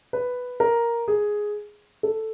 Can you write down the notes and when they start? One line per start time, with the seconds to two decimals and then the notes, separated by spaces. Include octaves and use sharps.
0.13 B4
0.60 A#4
1.08 G#4
2.03 A4